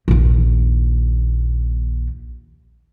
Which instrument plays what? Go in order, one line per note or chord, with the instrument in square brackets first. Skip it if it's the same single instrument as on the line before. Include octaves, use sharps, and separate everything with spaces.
[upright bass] A#1 D#2